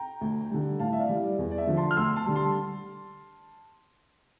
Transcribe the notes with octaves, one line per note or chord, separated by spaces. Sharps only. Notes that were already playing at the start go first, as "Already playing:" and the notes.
Already playing: G5 A#5
D2
D3 G3
A2 F5 A5
E5
D5 F5
E3 G3
D5
E2
D5
E5
D3 F3
A5 C6
F6
D2 C6 E6
A5 C6
D3 G3
A5 C6